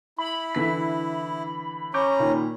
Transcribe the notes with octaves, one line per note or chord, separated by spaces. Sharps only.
E4 B5
D3 E3 B6
C#4 A#5 C#6 D6 G6
A#2 D#3